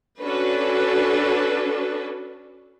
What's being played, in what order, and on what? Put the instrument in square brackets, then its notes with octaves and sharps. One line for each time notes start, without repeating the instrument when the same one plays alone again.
[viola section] C#4 D4 F#4 A4 B4